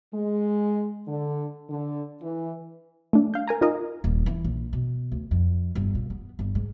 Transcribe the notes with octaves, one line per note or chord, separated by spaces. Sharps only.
G#3
D3
D3
E3
A3 D4
F5 G6
A#4 G#5 A#5
D#4 F4 A#4 D#5 F5
D#1
E3
A#1
B2
D2
F2
G1
A#2
B3
G1
G#2